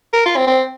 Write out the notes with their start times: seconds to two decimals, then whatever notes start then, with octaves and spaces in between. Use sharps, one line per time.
0.13 A#4
0.26 F4
0.37 C4
0.47 C4